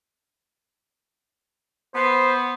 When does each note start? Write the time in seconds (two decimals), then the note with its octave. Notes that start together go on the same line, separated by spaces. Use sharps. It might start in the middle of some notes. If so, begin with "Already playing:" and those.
1.95 B3 C5